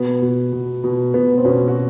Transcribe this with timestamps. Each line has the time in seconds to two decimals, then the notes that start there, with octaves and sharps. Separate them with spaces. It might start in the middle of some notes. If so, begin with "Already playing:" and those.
Already playing: B2 B3
0.22 B2
0.52 B2
0.84 B2
1.14 B2 B3
1.38 C4
1.45 B2 B3 C#4
1.68 F#4